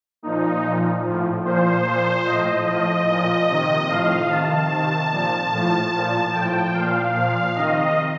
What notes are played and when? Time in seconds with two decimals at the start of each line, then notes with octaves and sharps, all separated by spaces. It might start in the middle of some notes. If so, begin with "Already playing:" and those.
0.23 A#2 F3 D#4
0.63 A#2 F3
1.04 A2 F3
1.45 A#2 F3 C5
1.85 A#2 F3
2.26 A2 F3 D#5
2.67 A2 F3 D#5
3.07 A#2 F3 D#5
3.48 C3 D#3
3.88 A2 F3 F5
4.29 C3 D#3 A5
4.70 C3 D#3
5.10 A#2 F3 A5
5.52 A2 F3
5.92 A#2 F3
6.33 A2 F3 G5
6.74 A#2 F3 F5
7.14 A#2 F3
7.55 C3 D#3 D#5